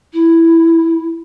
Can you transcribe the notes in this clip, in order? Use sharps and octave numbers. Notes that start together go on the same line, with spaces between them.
E4